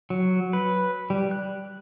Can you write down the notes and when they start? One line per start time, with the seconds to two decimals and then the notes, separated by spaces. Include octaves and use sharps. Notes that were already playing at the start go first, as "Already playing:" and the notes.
0.10 F#3
0.53 B4
1.10 G3
1.31 F#6